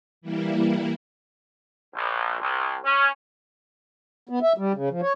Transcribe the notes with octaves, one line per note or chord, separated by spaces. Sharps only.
E3 G3 A#3 E4
A#1
C2
C#4
B3
E5
G3
C#3
F3
C#5